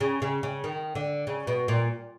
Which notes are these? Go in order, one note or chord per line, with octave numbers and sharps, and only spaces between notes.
C#3
C#3
C#3
D#3
D3
C#3
B2
A#2